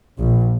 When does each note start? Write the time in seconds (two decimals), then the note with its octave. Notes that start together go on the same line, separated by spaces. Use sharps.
0.18 A#1